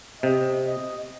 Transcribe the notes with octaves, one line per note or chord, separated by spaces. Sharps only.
C3 D#5
D#5